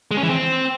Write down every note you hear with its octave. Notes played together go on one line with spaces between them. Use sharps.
G#3
C#4
E3
C4